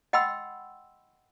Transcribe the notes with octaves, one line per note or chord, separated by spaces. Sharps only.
D#5 F#5 G5 B5 C6 E6